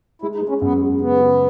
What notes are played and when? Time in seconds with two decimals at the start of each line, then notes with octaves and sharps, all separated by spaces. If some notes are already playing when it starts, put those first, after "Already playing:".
0.22 G#3 E4
0.35 D#4
0.41 G#3
0.49 C#4
0.62 F#2 B3
0.82 G#3
1.00 C#3 B3
1.21 C#3